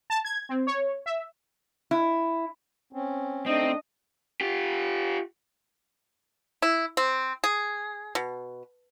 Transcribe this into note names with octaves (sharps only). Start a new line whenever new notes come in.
A5
G#6
C4
C#5
E5
E4
C4 C#4
A3 C4 D4 D#4 D#5 G5
F4 G4
E4
C4
G#4
B2